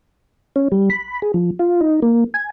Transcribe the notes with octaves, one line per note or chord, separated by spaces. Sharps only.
C#4
G3
B5
G#4
F3
F4
D#4
A#3
G#5